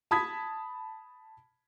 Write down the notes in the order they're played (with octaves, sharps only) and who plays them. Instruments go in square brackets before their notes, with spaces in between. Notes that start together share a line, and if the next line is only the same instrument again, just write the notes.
[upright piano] A5 B5 D#6 G#6 B6